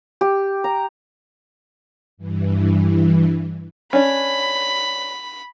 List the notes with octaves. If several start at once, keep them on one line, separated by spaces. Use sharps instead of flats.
G4
A#5
G2 E3
C#4 D4 B5